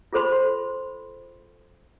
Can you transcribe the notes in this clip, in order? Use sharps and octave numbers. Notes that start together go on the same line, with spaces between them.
F4 G#4 A4 C5 B5 C6